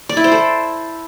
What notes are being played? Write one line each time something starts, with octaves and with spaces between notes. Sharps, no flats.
D5
E4
C5
A4